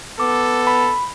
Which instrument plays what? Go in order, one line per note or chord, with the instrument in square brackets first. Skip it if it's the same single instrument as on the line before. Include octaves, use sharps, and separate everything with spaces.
[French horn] B3 [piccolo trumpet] A4 [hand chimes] D6
[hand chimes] B5